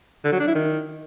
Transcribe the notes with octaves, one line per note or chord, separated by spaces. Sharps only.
D3
F#3
D4
E4
D#3